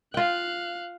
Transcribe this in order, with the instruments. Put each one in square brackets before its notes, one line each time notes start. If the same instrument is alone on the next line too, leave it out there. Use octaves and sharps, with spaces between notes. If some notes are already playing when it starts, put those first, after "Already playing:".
[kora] F4 G5 [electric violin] F5 F#6